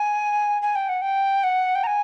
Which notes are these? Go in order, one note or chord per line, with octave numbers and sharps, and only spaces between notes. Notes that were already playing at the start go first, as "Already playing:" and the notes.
Already playing: G#5
G#5
G5
F#5
G5
F#5
G5
A#5
G#5